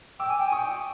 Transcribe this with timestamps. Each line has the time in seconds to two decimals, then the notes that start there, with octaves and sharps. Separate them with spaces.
0.20 G5 D6 E6
0.29 G#5
0.39 G5
0.48 G#5
0.52 G5 C#6 D#6